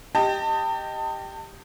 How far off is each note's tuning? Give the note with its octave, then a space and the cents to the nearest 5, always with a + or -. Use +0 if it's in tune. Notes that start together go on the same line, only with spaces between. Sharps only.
G4 +0 D#5 +0 A5 +35